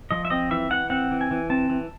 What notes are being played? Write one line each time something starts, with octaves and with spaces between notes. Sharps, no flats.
F3 D#5
E5
C4 D#5
E3 E5
E3 F#5
C4 F#5
E3
G#5
E3
C4 A5
E3